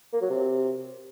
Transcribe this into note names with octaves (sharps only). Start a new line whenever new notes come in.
A#3
F#3
C3